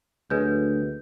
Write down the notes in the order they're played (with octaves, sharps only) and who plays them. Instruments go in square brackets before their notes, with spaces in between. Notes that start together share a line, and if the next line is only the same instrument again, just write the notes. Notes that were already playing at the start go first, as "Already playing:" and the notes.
[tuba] D2 [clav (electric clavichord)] F#3 G#3 [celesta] B4 G6